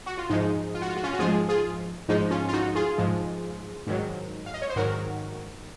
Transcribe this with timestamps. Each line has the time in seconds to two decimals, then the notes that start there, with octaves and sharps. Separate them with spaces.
0.06 F#4
0.18 F4
0.30 G#2 F3 G#3 D#4
0.74 F4
0.82 F#4
0.89 F4
0.97 F#4
1.03 C#4 F4
1.13 F#4
1.19 G#2 F3 G#3 F4 G#4
1.49 F4 G#4
2.08 G#2 F3 G#3 D#4
2.31 C#4 F4
2.48 F4
2.53 D#4 F#4
2.75 F4 G#4
2.98 G#2 F3 G#3
3.87 G#2 D#3 F#3
4.46 F5
4.54 D#5
4.62 C#5
4.69 C5
4.76 G#2 D#3 F#3 F#4 A#4